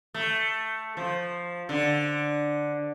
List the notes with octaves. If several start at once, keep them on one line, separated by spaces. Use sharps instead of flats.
A3
F3
D3